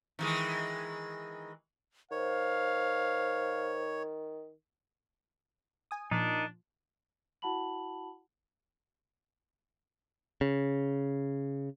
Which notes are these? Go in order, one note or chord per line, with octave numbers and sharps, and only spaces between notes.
D#3 E3 G#3
D#3 C5 C#5 F5
G#5 D#6
A#2 F3 D4 D#4 A#4
E4 F#4 F#5 A5 B5 F#7
C#3